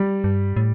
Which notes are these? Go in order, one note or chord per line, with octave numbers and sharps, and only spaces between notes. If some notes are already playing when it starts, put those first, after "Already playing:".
Already playing: G3
G2
A2